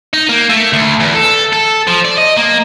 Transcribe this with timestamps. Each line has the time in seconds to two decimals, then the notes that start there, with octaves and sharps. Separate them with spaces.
0.14 D#4
0.29 A#3
0.49 A3
0.73 D2
1.00 E2
1.14 A4
1.53 A4
1.88 F3
2.05 D5
2.18 D#5
2.37 A#3